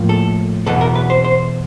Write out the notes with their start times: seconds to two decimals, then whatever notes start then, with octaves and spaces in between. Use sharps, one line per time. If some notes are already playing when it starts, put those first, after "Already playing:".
Already playing: A2 F3 A#3
0.09 A4
0.66 E2 B2 F#3 B3 A4
0.81 A#4
0.95 B4
1.10 C5
1.24 C5